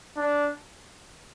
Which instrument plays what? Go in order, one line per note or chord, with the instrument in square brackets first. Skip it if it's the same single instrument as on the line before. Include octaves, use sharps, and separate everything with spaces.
[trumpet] D4